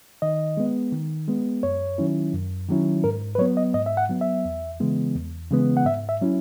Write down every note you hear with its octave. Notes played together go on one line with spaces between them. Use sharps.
D#3 D#5
G#3 B3
D#3
G#3 B3
F#2 C#5
D#3 F#3 C#4 E4
F#2
D#3 F#3 C#4 E4
G#2 A#4
B4
F#3 B3 C#5
D#5
G#2 D#5
E5
F#5
F#3 B3
E5
E2
C#3 E3 G#3 B3
E2
C#3 E3 G#3 B3
F#5
G#2 E5
E5
F#3 C#4 E4